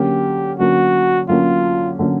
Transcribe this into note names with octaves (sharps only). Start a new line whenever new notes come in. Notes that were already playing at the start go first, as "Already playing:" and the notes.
Already playing: D3 F#3 A#3 C#4 G4
D3 F#3 A#3 C#4 F#4
D3 F#3 A#3 C#4 F4
D3 F#3 A#3 C#4